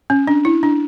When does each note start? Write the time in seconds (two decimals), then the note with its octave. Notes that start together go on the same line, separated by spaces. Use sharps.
0.10 C#4
0.27 D4
0.45 E4
0.63 D4